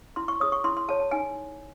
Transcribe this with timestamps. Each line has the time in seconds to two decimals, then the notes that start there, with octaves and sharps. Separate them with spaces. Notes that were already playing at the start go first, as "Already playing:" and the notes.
0.16 E4 C6
0.28 C#6
0.40 G#4 C#5 D#6
0.52 C#6
0.64 E4 C6
0.77 C6
0.88 G#4 C#5 A5
1.00 A5
1.11 D#4 G#5